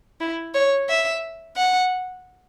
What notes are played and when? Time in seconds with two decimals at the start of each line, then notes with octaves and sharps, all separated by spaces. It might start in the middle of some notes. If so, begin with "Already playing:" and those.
0.21 E4
0.54 C#5
0.89 E5
1.57 F#5